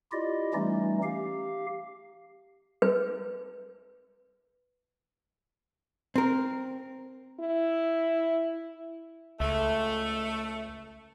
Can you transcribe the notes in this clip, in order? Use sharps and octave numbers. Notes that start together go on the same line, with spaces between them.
E4 F4 G4 D5 D#5
E3 G3 A3 C#4 D#4
G4 F5
B4
C4 A#4
E4
C#2 A3